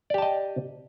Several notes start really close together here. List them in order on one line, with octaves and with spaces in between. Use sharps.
D5 G4 A5 D#5